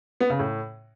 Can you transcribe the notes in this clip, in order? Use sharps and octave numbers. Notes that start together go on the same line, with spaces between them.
B3
C#3
A2